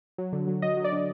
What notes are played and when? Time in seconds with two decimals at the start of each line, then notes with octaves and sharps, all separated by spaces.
0.18 F#3
0.33 D3
0.47 F#3
0.62 F#3 D#5
0.77 F#3
0.84 D5
0.92 D3